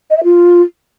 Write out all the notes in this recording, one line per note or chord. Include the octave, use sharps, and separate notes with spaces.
D#5
E5
F4